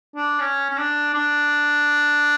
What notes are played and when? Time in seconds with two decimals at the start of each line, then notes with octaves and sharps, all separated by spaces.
0.15 D4
0.40 C#4
0.70 C#4
0.78 D4
1.14 D4